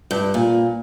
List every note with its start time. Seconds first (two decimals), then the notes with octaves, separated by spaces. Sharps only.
0.11 G2
0.34 A#2